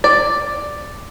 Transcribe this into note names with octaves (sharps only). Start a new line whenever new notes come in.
D5